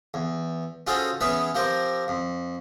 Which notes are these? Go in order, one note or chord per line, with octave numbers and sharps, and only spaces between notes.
E2
C#4 F4 F#4 G#4 A4 C5
E3 B3 C#4 G#4 B4
F3 C4 G4 A#4
F2